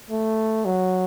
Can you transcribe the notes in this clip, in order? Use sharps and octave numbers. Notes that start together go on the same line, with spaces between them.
A3
F#3